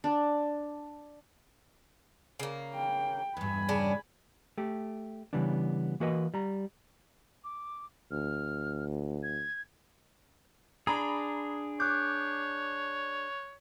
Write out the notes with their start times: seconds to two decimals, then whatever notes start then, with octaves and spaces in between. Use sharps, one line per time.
0.04 D4
2.40 C#3 A#3
2.74 G5
3.37 E2 G2 G#5 B5
3.69 C#3 C#4 D4
4.58 A3 G4
5.33 C#3 E3 G3 B3 D4
6.00 E3 A#3 F#4 A#4 B4 D#5
6.34 G3 A#5
7.44 D6
8.11 D2 F6
9.23 G#6
10.87 D4 G#4 A#5 B5
11.80 C#5 D6 F#6 G6